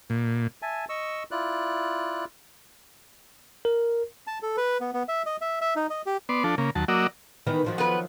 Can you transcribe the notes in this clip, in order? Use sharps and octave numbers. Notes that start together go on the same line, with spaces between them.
A#2
E5 G#5 A5
D#5 C#6 E6
E4 F4 D5 F#6
A#4
A5
A4
B4
B3
B3
E5
D#5
E5
E5
D#4
D#5
G4
B3 D5 C6
F3 D4 A4
C#3 A#3
D#2 F#3 A5
F#3 A#3 F#4 D5 D#5 E6
D#3 E3 B3
D#3 F3 F#3
B3 B4